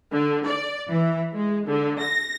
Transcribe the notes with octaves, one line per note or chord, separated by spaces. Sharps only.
D3
D5
E3
G#3
D3
A#6